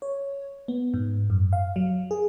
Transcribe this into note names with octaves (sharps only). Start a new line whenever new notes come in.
C#5
B3
G#2
F#2
F5
F#3
G#4